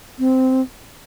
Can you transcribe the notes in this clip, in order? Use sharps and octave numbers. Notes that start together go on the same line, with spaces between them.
C4